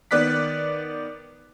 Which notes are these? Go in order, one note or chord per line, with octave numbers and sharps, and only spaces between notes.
D#3 B3 D5 F#6 B6